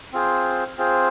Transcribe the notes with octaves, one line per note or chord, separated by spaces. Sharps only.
C4 F4 G#4 C5
C4 F4 G#4 C5